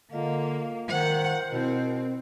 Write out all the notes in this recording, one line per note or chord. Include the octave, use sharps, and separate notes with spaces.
D3 A#3 F4 D#5 F5
D#3 A#4 C5 F#5
B2 C4 E4